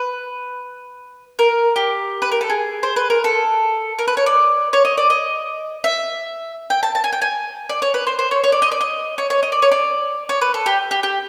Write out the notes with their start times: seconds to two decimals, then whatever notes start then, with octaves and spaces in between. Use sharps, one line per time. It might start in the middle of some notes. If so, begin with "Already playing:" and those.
Already playing: B4
1.39 A#4
1.76 G4
2.22 B4
2.31 A#4
2.41 A4
2.50 G#4
2.83 C5
2.96 B4
3.10 A#4
3.24 A4
3.99 A#4
4.07 B4
4.17 C#5
4.26 D5
4.73 C#5
4.85 D#5
4.98 D5
5.10 D#5
5.84 E5
6.70 G5
6.83 A5
6.95 A5
7.04 G#5
7.13 G5
7.22 G#5
7.69 D5
7.82 C#5
7.94 B4
8.07 C5
8.19 C5
8.31 C#5
8.44 C#5
8.52 D5
8.62 D#5
8.71 D5
8.81 D#5
9.18 C#5
9.30 C#5
9.43 D#5
9.52 D5
9.62 C#5
9.71 D5
10.29 C#5
10.41 B4
10.54 A4
10.66 G4
10.91 G4
11.03 G4